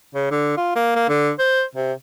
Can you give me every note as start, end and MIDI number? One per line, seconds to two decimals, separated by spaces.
0.15 0.27 49
0.31 0.57 50
0.57 0.75 65
0.76 0.95 58
0.95 1.09 58
1.09 1.30 50
1.39 1.63 72
1.75 1.92 48